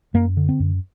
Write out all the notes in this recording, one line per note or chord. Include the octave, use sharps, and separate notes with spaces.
F#2 A#3
D3
C4
F#2